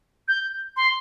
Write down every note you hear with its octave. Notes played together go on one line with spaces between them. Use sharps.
G6
C6